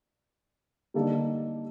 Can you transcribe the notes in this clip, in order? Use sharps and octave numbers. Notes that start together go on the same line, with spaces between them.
D3 G3 A#3 D#4 A4